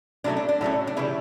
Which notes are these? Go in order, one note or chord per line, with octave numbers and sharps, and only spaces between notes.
A2 F#3 A3 C#4 D4
D4
D4
A2 F#3 A3 C#4
D4
C#3 E3 G3 E4